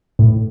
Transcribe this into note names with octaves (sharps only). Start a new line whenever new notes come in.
A2